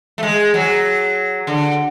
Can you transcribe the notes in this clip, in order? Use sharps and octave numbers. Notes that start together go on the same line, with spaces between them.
A3
G#3
F#3
D3